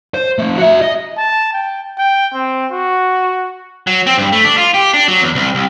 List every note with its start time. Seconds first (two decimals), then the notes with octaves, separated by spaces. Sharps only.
0.14 C5
0.39 F3 A3
0.57 F#4 E5
0.82 D#5
1.18 A5
1.53 G5
1.98 G5
2.34 C4
2.72 F#4
3.87 F#3
4.07 C4
4.18 G2
4.32 A3
4.44 D4
4.58 F4
4.74 G4
4.94 D4
5.08 F#3
5.22 E2
5.35 C2
5.55 C2